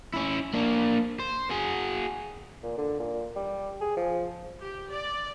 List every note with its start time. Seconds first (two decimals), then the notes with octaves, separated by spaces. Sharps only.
0.14 C#4 E4
0.54 A#3 D4
1.20 C5
1.50 F#4 G#4
2.63 A#2
2.77 D3
2.99 A#2
3.36 G3
3.81 G#4
3.96 F3
4.60 G4
4.91 D5